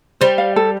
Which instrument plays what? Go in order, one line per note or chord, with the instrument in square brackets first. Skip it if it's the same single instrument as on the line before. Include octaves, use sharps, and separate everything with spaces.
[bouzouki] G3 [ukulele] C5
[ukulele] F5
A4